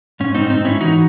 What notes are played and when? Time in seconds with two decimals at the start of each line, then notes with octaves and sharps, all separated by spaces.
0.20 G#2 C#4
0.34 C4 D#4
0.41 G#2
0.50 C4 D#4
0.60 G#2 C#4 E4
0.81 E3 D#4 F#4